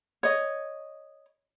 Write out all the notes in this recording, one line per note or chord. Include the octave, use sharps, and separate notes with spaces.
C#5 D#5